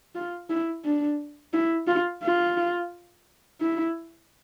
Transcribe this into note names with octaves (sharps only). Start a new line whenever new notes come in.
F4
E4
D4
E4
F4
F4
E4